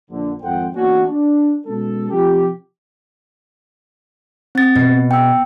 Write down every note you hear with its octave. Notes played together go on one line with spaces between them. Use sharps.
A#1 D3
G#1 F2 A4 C5 F#5 G5
E3 A#3 B3 C#4 D4 F#4
D4
B2 G#3 C#4 A4
C3 F3 F4 G4
C4 A6
B2
G5 E6